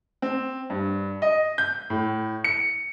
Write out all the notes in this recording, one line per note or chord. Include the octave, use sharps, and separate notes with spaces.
C4
G2
D#5
G6
A2
C#7